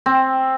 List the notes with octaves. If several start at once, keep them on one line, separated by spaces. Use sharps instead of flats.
C4